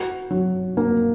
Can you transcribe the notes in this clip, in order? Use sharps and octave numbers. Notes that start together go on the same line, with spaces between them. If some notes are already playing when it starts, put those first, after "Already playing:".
Already playing: F#4
F#3
A#3